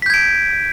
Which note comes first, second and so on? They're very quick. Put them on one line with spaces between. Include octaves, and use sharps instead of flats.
B6 G6 G#6 D7